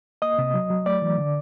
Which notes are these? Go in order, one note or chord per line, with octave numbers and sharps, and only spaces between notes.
A#3 D#5 D#6
C3
F#3
F#3
A3 D5 D6
E3
D3